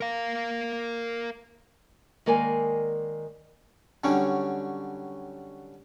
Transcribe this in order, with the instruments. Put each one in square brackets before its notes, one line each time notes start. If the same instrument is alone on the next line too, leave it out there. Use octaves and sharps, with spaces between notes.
[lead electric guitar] A#4 F5
[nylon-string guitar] D#3 G#3 A#3 A#4 D5 G#5
[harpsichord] D3 F#3 G3 C#4